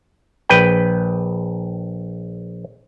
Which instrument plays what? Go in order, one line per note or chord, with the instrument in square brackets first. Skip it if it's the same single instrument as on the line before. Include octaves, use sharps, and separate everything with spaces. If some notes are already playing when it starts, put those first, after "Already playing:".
[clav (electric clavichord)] A#1 B4 G5